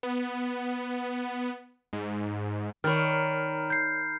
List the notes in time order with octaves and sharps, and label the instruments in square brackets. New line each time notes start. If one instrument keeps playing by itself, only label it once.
[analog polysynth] B3
G#2
[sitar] D#3 [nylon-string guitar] C#5 D5 [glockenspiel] B5 F6
[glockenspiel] G6 C7